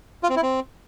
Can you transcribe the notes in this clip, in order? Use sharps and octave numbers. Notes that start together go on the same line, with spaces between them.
F4
C4
E4
C4